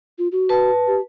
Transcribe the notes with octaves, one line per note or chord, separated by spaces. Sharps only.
F4
F#4
B4 A5
G4